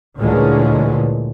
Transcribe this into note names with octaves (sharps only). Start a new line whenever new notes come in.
D2 A#2 D3 E3 G#3 C#4